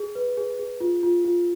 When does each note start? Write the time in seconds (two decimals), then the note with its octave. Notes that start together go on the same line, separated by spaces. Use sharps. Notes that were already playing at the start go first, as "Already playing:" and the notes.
Already playing: G#4
0.15 B4
0.37 G#4
0.59 G#4
0.80 F4
1.03 F4
1.25 F4